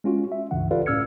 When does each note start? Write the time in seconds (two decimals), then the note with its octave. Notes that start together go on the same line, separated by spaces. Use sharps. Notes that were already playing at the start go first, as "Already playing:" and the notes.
0.04 G#3 C#4 F4 F#4
0.32 E5
0.51 C#2 G2 C#3 E3 F#5
0.71 F4 G4 A4 B4 D5 F5
0.86 A2 C#4 E6 F6 G#6 C#7